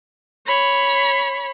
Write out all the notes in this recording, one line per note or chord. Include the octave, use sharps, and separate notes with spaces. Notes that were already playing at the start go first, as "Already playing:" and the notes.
C#5 B5